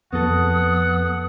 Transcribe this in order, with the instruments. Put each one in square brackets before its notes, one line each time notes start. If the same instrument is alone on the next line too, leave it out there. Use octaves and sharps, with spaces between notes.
[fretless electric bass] F2 [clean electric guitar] B3 A4 [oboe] F#5 [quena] D#6